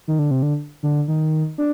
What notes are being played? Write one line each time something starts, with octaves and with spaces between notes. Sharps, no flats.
D#3
D3
C3
D3
D3
D#3
D4